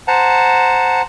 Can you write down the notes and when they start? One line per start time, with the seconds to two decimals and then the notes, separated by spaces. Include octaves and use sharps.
0.08 C5 F#5 A5 A#5